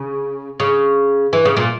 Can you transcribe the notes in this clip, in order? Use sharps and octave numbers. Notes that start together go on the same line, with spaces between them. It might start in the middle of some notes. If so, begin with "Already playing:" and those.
Already playing: C#3
C#3
E3
C#3
A#2